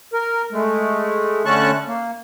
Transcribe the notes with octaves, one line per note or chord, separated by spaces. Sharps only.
A#4
G#3 A3
D3 A3 C#4 A5 C#6 F#6
A#3